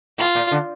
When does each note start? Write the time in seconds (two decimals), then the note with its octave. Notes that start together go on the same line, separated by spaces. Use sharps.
0.18 A2 F4
0.35 A#2
0.51 D3